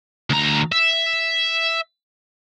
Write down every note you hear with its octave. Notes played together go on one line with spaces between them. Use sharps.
D2 A#5
E5